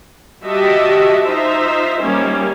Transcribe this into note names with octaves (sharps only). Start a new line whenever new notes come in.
G3 F#4 G4 D#5 E5 A5
D#4 F4 C5 E5
D#3 G3 A#3 C#4 G4